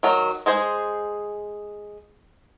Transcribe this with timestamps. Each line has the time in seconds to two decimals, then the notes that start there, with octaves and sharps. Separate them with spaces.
0.03 D#3 F#3
0.46 G#3 G#4 C5